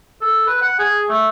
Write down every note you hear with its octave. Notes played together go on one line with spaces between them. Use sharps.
A4
B4
F#5
G#4
A3